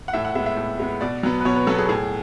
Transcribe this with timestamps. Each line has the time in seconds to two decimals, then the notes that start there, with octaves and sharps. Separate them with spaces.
0.08 F#5
0.13 A2 E5
0.25 F#5
0.35 G#3 B3 E5
0.46 E5
0.57 A2
0.80 G#3 B3
1.01 B2 D5
1.23 F#3 B3
1.40 B4
1.45 B2 C#5
1.56 B4
1.67 F#3 B3 A4
1.78 G#4
1.89 A2 G#4